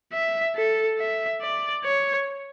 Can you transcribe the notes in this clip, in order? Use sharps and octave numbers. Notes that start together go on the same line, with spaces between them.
E5
A4
E5
D5
C#5